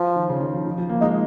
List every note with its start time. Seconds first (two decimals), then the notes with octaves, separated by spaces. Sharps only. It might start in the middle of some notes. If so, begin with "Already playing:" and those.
Already playing: F3
0.16 D#3
0.29 C#3
0.40 D#3
0.53 F3
0.66 D#3
0.78 F3
0.89 A#3
1.01 G#3 D#4